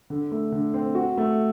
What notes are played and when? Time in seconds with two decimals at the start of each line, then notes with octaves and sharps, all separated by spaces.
0.10 D3
0.32 A3
0.52 D3
0.74 C4
0.95 F#4
1.17 A3